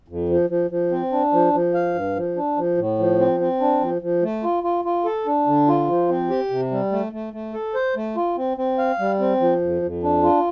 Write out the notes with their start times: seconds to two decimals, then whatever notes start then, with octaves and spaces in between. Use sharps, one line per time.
0.08 F2
0.29 F3
0.50 F3
0.70 F3
0.91 C4
1.12 D4
1.33 F3
1.53 F3
1.74 F5
1.94 G2
2.15 F3
2.36 D4
2.56 F3
2.77 A2
2.99 F3
3.19 C4
3.40 C4
3.60 D4
3.81 F3
4.02 F3
4.23 A3
4.43 F4
4.63 F4
4.85 F4
5.05 A4
5.26 D4
5.46 D3
5.68 F4
5.88 F3
6.09 C4
6.30 G4
6.50 C3
6.71 G3
6.92 A3
7.12 A3
7.33 A3
7.54 A4
7.75 C5
7.96 A3
8.16 F4
8.37 C4
8.57 C4
8.78 F5
8.99 G3
9.19 C4
9.40 F3
9.62 F2
9.82 F2
10.03 D4
10.23 F4